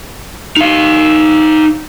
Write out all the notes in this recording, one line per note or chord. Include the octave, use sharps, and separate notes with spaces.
D#4 F5